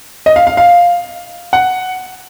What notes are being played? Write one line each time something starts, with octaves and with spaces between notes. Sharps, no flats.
D#5
F5
F5
F5
F#5